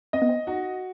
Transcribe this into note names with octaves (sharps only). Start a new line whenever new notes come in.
C4 D#5
B3
C4
D#4 F#4